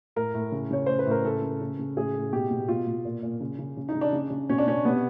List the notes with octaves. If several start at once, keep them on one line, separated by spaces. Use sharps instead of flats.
A2 A#4
A2
C#3
C#3 C#5
A2 C5
B4
A2 A#4
C#3 A4
C#3
C#3
C#3
A2 G#4
A2
B2 G4
B2
B2 F4
B2
A#2
A#2
C#3
C#3
C#3
D#4
C#3
D4
C#3
C#3
B2 C#4
D4
B2 C#4
C3 B3